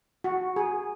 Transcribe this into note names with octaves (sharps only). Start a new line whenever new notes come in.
F#4
G#4